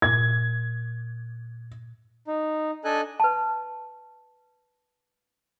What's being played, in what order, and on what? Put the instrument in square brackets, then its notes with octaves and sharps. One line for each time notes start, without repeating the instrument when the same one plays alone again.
[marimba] A#2 [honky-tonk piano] G#6
[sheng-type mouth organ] D#4
D4 A4 D#5 G#5 F#6
[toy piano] B4 A5